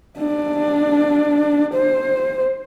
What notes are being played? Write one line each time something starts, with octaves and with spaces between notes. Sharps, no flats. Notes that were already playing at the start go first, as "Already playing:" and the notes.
D4
C5